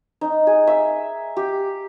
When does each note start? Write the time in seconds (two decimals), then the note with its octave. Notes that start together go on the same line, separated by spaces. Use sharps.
0.21 D#4
0.47 G#4
0.67 E5
1.37 G4